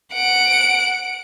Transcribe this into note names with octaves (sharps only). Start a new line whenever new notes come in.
F#5 D7